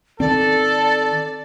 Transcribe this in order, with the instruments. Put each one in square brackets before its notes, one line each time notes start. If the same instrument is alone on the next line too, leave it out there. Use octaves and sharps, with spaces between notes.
[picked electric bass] D#3 C4 [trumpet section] A4 [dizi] D5